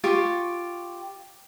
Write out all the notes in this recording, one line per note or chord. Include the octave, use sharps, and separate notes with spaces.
F4 G4 C#6